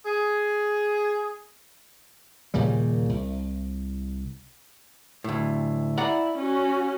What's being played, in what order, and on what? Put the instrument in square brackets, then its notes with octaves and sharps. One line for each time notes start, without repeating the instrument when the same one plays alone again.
[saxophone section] G#4
[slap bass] D#2 A#2 C#3 G3
C2
[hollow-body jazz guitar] D2 A2
[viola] E4 [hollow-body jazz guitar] D5 F#5 A#5
[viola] C#4 F#4